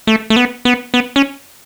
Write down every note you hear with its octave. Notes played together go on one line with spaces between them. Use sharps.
A3
A3
B3
B3
B3
C#4